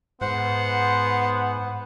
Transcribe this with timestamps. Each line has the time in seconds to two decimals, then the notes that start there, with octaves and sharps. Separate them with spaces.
0.21 G#2 B3 C5 F#5